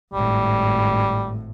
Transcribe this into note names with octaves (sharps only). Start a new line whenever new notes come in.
G#1 A2 G3